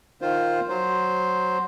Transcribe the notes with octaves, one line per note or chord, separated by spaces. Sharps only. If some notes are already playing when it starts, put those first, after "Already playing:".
D#3 F4 C5
F#3 C5